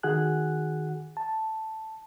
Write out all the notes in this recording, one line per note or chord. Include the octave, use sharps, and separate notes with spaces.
D#3 F#4 G#4 F#5 G#5 F#6
A5